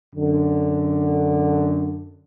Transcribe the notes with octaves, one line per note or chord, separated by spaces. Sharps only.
F#2 D3